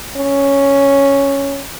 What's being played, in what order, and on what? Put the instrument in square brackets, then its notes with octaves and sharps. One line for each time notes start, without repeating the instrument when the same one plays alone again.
[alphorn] C#4